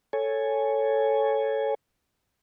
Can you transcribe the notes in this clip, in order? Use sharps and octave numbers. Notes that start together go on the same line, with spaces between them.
A4 C#5 G#5